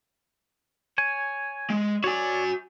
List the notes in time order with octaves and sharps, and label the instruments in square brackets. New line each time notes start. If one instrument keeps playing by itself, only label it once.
[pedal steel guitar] C#5 G#5
[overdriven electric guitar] G#3
[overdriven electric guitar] F#4 G#5 [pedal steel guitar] C#5 D5